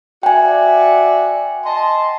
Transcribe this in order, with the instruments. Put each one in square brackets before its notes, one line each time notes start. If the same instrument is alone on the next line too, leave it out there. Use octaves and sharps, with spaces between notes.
[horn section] F#4 D5 E5 [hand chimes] G5 G#5
[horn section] D#5 A5 C6